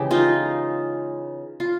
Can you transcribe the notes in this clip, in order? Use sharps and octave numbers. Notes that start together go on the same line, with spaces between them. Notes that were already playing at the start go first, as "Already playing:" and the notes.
Already playing: C#3 E3 G#3 G4
D#4 F4
F4